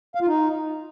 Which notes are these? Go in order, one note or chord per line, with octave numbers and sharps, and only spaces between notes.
F5
F4
D#4